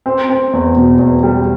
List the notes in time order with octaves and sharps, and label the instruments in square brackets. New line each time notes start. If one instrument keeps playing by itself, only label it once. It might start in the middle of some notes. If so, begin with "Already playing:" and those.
[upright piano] C4
C4
E2
B2
E2
G3